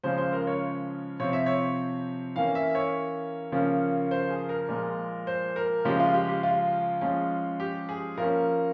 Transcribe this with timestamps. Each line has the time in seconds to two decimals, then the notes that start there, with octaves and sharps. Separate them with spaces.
0.04 C#3 F3 G#3 C#4 C5
0.18 C5
0.33 A#4
0.47 C#5
1.19 C3 F3 C4 C#5
1.33 E5
1.46 C#5
2.36 E3 A#3 C#4 F5
2.55 E5
2.75 C#5
3.52 C#3 F3 A#3 C#4
4.11 C5
4.30 G#4
4.49 A#4
4.68 A#2 F3 G#3
5.27 C5
5.56 A#4
5.85 C#3 F3 G#3 C#4 G4
6.00 F4
6.14 G4
6.29 G4
6.43 F4
7.01 F3 G#3 C#4
7.60 G4
7.89 G#4
8.18 F3 A#3 C#4 A#4